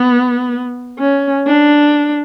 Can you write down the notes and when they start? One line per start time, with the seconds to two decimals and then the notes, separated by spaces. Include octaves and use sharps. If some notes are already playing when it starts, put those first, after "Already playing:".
Already playing: B3
0.99 C#4
1.47 D4